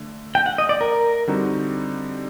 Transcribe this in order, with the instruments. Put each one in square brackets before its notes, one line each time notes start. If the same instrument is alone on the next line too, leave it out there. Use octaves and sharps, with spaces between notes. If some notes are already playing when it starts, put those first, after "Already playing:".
Already playing: [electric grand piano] D3 A3
[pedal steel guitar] G5
F#5
D#5
D5
A#4
[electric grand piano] D3 G3 C4 D#4 F#4